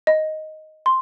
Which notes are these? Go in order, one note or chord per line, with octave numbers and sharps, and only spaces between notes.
D#5
C6